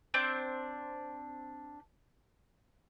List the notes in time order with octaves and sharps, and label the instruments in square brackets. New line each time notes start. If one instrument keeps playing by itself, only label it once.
[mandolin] C4 D4 G6